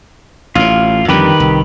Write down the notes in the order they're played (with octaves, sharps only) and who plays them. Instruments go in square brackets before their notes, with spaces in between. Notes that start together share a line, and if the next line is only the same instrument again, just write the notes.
[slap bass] A1 A2 [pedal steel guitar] F4
[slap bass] F2 D3 G3 [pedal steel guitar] D#3 G4 B4
[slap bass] C2